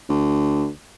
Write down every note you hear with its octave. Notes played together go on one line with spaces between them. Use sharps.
D2